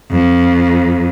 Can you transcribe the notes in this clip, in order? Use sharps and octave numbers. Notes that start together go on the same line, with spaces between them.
F2